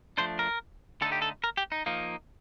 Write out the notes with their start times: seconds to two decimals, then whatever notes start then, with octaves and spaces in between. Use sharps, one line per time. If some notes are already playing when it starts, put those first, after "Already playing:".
0.18 F3 A3 D4 C5
0.39 A#4
1.02 D3 A3 D#4 A4
1.12 G4
1.22 A4
1.44 A#4
1.57 G4
1.72 D#4
1.86 F3 A#3 D#4